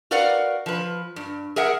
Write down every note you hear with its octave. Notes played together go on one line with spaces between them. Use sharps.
F#4 A#4 B4 D5 F5 F#5
F3 B4
G2
G#4 A#4 E5 F#5